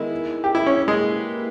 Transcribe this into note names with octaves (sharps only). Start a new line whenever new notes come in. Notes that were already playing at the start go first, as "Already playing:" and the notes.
Already playing: D#3 G#3 B3 E4
G4
E4
C#4
A#3 E4 G4 B4
G#3